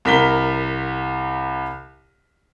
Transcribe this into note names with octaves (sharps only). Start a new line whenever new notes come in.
C2 A#4 B6 G7